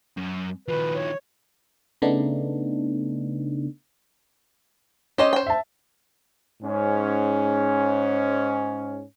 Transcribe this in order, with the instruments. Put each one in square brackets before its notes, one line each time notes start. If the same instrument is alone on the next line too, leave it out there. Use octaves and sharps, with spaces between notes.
[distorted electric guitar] F#2
[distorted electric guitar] D#3 F3 [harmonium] B4
[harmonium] C#5
[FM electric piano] C#3 A3 B3 D4 D#4
[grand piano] C#4 [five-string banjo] G4 C5 D#5
[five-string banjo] C5 G5
[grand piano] E5 A5
[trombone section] G#2 C#4